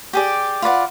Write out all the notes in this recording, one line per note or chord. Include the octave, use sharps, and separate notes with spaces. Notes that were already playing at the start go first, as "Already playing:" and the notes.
G4 G#4 D5
F4 B4 D5 F#5